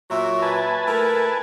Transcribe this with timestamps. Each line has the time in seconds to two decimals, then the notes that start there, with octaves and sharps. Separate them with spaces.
0.10 A#2 F#3 E5
0.42 B4 G#5 A5
0.87 A3 E4 A#4